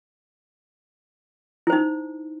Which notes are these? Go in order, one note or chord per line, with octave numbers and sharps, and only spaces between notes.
D#4 E4 C5